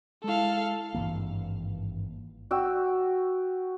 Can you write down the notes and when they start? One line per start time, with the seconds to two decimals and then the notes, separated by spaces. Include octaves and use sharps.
0.24 G#3 E4 A4 F5
0.94 G#1 G2 E3 A#3
2.51 F#4 G5 E6